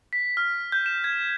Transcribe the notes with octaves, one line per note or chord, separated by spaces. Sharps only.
B6
F6
G6
E7
G#6